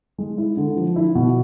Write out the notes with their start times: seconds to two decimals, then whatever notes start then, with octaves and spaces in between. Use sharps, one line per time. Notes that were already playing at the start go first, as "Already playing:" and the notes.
0.18 G#3
0.38 E4
0.57 D3
0.77 F3
0.96 E4
1.15 B2